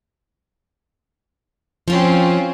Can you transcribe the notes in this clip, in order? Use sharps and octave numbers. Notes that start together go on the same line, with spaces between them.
F3 C4 C#4 F4